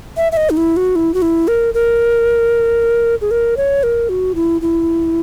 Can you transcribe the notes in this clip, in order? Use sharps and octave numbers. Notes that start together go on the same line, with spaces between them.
E5
E5
D#5
D#4
E4
F#4
E4
F#4
E4
A#4
A#4
G#4
A#4
C#5
A#4
F#4
E4
E4